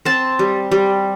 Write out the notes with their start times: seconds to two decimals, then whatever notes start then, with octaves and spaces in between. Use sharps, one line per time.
0.05 C4 A5
0.39 G3
0.71 G3